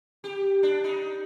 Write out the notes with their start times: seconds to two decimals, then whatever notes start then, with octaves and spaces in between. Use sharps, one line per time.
0.24 G4
0.63 D4
0.84 D#4